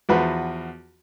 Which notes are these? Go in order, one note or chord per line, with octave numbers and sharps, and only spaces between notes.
E2 F3 F#4 B4